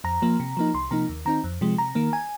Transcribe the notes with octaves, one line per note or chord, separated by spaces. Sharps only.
F2 A#5
F3 A#3
C3
F3 A#3 D#4
C2 C6
C3 F3 A#3 D#4 A#5
D#2
D#3 C4 D#4 A#5
F2
C3 F3 G#3
C3 A#5
D#3 A#3
G#5